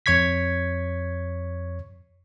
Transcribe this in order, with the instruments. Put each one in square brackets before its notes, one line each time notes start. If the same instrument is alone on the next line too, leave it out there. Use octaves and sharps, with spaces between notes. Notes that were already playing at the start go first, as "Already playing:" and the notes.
[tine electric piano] F2 C#5 C#6 G#6 B6